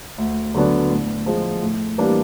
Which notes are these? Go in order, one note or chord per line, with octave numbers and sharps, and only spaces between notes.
D2
D3 F#3 B3 D4
A2
F3 G#3
A2
E3 G3 A#3 D4